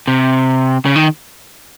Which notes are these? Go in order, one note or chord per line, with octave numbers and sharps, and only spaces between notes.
C3
C#3
D#3